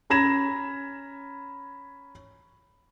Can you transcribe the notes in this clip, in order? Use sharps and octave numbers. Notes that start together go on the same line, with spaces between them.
C#4 A#5 B5 G#6 A#6 E7